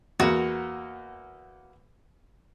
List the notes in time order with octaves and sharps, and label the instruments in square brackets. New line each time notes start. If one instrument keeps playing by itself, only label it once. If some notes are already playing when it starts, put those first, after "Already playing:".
[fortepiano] E2 A#3 [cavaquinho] F#4